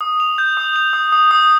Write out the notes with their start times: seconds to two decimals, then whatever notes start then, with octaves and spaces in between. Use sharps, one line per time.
0.01 D#6
0.20 F7
0.38 G6
0.57 D#6
0.76 F7
0.93 D#6
1.12 D#6
1.31 D#6